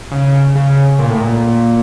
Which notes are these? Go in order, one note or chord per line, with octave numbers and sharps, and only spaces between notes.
C#3
C#3
A#2
A2
A#2